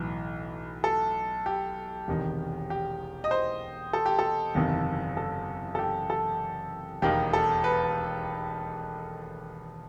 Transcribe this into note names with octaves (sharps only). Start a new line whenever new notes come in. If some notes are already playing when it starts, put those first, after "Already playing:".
Already playing: B1 A2 E3
A4
G4
E1 E2 C3 D#3
G4
D#5
C5
A4
G4
A4
F#1 E2 C3 D#3
A4
A4
G4
A4
E1 D#2 D#3 G4
A4
B4